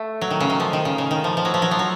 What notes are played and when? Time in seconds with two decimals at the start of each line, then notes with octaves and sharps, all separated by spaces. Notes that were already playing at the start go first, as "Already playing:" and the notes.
Already playing: A3
0.21 F#3
0.31 D#3
0.40 C#3
0.50 D#3
0.60 F3
0.73 D#3
0.85 C#3
0.98 C#3
1.11 D#3
1.24 F3
1.37 F3
1.45 F#3
1.54 F3
1.62 F#3
1.71 F3
1.79 F#3